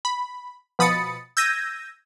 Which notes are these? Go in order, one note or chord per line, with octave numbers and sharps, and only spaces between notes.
B5
B2 F3 B5 D#6 A6 C#7
E6 G6 G#6 A#6 D#7